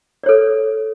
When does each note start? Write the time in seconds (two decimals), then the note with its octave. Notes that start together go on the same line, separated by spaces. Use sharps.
0.23 D5
0.26 C#5
0.29 A4